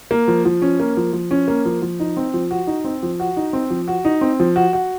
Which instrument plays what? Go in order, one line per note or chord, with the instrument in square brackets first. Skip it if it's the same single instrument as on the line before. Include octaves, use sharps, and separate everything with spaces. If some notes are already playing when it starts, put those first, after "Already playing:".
[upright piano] A#3
F3
F3
C#4
A#3
F3
F3
C#4
A#3
F3
F3
D#4
C4
F3
F#4
D#4
C4
F3
F#4
D#4
C4
F3
F#4
D#4
C4
F3
F#4
F#4